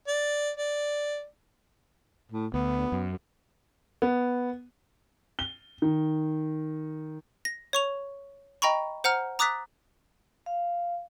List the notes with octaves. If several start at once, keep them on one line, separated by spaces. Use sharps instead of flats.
D5
D5
A2
D2 B3
F#2
B3
G7
D#3
A#6
C#5 C#6 F7
D#5 G5 A#5 B5 C#6
C5 F#5 A#5 F6
A#5 D6 D#6 F#6 A6 B6
F5